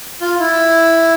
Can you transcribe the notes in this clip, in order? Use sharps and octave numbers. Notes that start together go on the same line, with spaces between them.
F4
E4